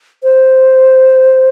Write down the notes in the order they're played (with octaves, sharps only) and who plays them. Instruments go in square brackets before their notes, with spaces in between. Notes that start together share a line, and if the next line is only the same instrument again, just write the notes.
[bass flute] C5